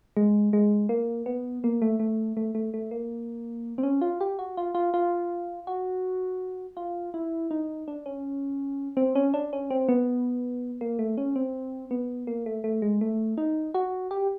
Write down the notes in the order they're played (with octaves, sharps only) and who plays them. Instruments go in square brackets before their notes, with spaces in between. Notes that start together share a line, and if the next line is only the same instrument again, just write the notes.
[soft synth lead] G#3
G#3
A#3
B3
A#3
A3
A3
A3
A3
A3
A#3
C4
C#4
F4
G4
F#4
F4
F4
F4
F#4
F4
E4
D#4
D4
C#4
C4
C#4
D4
C#4
C4
B3
A#3
A3
C#4
C4
B3
A#3
A3
A3
G#3
A3
D#4
F#4
G4